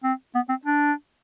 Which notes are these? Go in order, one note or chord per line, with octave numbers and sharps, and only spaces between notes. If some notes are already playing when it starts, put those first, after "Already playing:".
C4
B3
C4
D4